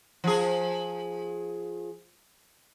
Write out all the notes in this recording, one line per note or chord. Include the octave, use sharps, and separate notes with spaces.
F3 G#4